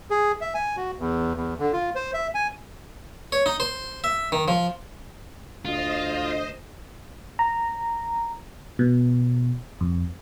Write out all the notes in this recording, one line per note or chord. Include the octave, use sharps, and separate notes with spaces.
G#4
E5
G#5
F#4
E2
E2
D3
F4
C5
E5
G#5
C#5
D#4
C5
E5
D#3
F3
D2 F4 C5 D#5
A#5
B2
F2